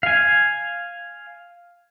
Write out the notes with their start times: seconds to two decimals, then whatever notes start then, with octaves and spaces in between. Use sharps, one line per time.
0.03 F5 G#5